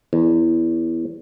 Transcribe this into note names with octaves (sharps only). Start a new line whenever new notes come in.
E2